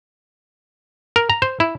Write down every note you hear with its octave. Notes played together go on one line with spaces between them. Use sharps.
A#4
A#5
C5
E4